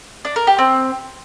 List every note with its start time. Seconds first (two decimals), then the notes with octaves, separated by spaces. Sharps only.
0.25 D4
0.36 A#4
0.47 G4
0.59 C4